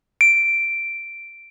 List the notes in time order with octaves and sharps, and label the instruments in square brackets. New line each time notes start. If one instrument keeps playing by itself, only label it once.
[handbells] D7